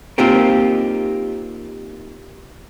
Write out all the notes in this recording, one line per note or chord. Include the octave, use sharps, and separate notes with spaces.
A#3 C4 D#4 F4 G4 A#4